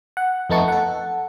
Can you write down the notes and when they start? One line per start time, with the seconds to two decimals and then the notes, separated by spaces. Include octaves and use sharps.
0.17 F#5
0.50 F2 A3 B3 D#4 A5 C#6
0.68 A4 F#5